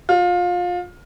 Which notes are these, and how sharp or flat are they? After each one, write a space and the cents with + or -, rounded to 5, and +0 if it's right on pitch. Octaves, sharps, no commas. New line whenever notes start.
F4 +25